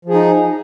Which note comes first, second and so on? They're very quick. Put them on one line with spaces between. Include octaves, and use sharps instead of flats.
F3 G#4 D#4